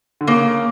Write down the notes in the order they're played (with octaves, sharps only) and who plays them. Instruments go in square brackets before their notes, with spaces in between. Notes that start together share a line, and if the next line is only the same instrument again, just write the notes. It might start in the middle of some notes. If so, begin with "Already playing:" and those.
[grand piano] D3
[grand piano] C#3 [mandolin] A#3